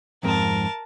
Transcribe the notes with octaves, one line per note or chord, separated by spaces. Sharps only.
F2 G#2 C4 A#4 A5